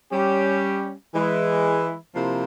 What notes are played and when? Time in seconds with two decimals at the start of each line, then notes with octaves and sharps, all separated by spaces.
0.12 G3 C#4 G4
1.14 E3 G#3 E4
2.16 C3 F3 A#3 E4